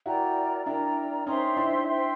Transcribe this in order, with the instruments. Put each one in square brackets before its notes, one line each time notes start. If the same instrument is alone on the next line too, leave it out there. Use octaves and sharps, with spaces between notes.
[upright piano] E4 F#4 [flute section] A#4 D5 G5 A#5
[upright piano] D4 E4 [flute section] A#4 D5 G5 A#5
[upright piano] C#4 D#4 [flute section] C5 E5 G5 C6
[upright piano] D4 E4
[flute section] C5 E5 G5 C6